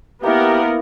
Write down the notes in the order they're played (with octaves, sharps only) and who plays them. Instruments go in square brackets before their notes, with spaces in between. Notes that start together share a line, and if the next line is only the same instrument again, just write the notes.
[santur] A#3 E4 [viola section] B3 A#4 [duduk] G4